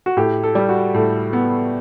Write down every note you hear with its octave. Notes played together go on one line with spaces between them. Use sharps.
F#4
A2 G4
A4
G3
F#4
A2
B3